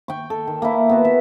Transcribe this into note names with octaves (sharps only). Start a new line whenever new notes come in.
G5 C#6
A4
D#3
A#3 E4
B3 F#4
E5